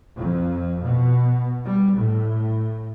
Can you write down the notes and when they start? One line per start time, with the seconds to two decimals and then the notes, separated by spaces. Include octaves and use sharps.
0.18 F2
0.83 B2
1.65 G3
1.95 A2